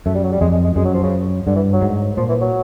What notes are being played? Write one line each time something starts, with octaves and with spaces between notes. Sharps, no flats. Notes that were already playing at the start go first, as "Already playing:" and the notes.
F#2 A3
G3
F#3
G3
F2 G#3
G#3
G#3
F#2 G#3
F#3
F3
C#3
G2 D3
E3
F#3
G#2
A#2 F3
E3
F#3